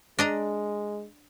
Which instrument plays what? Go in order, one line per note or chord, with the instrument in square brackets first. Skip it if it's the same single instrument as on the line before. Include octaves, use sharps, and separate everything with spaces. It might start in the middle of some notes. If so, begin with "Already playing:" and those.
[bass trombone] G#3 [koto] D4 D#5 A#5